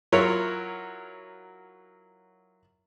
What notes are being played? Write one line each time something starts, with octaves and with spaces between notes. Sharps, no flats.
F#3 E4 F4 A#4 C#5